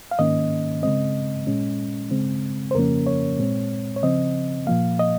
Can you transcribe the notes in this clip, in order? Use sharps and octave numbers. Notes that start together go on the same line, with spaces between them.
F5
G#2 D#3 A#3 C#4 D#5
C#3 G#3 C4 D#5
A#2 G#3 C#4
C#3 G#3 C4
C5
F2 C#3 F3 A#3 C#4 A#4
C#5
A#2 G#3 C4
C#5
C#3 F3 C4 D#5
A#2 F3 A#3 F5
D#5